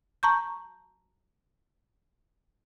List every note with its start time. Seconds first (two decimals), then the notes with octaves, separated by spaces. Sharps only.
0.23 A5 A#5 C#6 G6